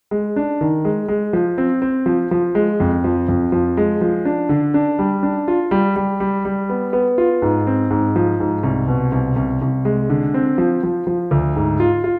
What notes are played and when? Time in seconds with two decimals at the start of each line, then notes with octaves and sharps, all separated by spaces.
0.11 G#3
0.36 D4
0.61 D#3
0.85 G#3
1.08 G#3
1.33 F3
1.58 C4
1.82 C4
2.06 F3
2.31 F3
2.55 G#3
2.80 F2
3.04 F3
3.28 F2
3.52 F3
3.77 G#3
4.01 F3
4.25 D4
4.49 D3
4.74 D4
4.99 G3
5.23 D4
5.48 F4
5.71 G3
5.96 G3
6.20 G3
6.45 G3
6.70 B3
6.93 B3
7.18 F4
7.42 G#2
7.67 C4
7.90 G#2
8.16 F3
8.40 G#2
8.63 C2
8.88 B2
9.12 C2
9.36 C2
9.62 C2
9.85 G#3
10.10 D3
10.34 C4
10.58 F3
10.83 F3
11.07 F3
11.31 D2
11.56 G#2
11.80 F4
12.04 F4